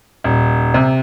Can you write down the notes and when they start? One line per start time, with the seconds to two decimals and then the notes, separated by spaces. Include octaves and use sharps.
0.24 D#1
0.74 C3